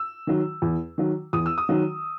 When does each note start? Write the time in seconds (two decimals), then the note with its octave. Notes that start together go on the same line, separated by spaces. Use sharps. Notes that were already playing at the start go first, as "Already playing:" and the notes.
Already playing: E6
0.27 D#3 F#3
0.62 E2
0.98 D#3 F#3
1.33 E2 D#6
1.46 E6
1.58 D#6
1.69 D#3 F#3